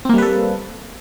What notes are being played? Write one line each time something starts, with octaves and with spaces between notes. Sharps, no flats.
G3 A#3 C4 A4 B4